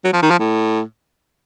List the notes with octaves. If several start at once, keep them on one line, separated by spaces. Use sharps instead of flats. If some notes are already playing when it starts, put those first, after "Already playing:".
F#3
F3
D#3
F3
A2